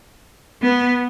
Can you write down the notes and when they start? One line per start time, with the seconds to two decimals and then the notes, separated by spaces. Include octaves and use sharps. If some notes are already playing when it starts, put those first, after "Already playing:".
0.62 B3